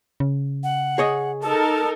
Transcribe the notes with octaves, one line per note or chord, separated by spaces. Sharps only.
C#3
F#5
G#4 C#5 D#5
D#4 A4 A#4 A5